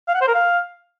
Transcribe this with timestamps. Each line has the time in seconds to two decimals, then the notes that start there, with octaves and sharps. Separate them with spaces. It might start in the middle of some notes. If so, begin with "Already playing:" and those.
0.08 F5
0.14 F#5
0.21 C5
0.27 A#4
0.34 F5